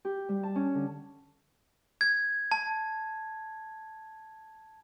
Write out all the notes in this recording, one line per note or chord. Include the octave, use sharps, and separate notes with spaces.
G4
G3
A5
C#4
D3
G#6
A5